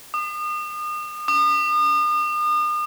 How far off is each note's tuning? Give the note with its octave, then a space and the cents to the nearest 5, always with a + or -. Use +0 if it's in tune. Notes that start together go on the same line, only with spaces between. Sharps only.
D#6 -35
D#6 -40